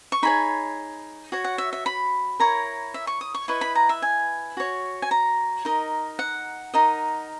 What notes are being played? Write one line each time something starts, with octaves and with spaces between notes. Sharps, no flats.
C#6
D#4 G#4 C#5 B5
F#4 C#5
F#5
E5
E5
B5
E4 A#4 C#5 A#5
E5
C#6
D#6
C#6
E4 B4 D#5 C#6
B5
A#5
E5
G#5
F#4 C#5
G#5
A#5
D#4 A#4 D#5
F#5
D#4 A#4 D#5